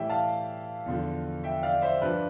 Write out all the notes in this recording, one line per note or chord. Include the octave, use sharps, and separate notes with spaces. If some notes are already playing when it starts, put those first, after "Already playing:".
Already playing: A2 E3 G3 E5 G5
F5 A5
E2 D3 F3
E5 G5
D5 F5
C5 E5
G2 F3 B4 D5